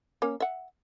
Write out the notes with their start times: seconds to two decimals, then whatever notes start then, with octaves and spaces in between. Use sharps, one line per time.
0.22 A#3 C#4
0.40 E5 F#5